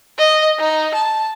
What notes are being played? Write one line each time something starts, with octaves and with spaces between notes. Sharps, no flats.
D#5
D#4
A5